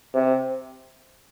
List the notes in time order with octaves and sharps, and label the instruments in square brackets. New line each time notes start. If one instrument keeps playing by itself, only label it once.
[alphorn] C3